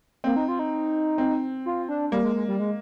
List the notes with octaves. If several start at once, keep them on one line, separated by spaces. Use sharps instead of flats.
A#3 C4
D#4
F4
D#4
C4
F4
D4
G3 A#3
G#3
G#3
G3
G#3